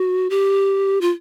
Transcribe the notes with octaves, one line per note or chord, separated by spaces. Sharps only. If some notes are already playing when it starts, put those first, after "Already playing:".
Already playing: F#4
G4
F4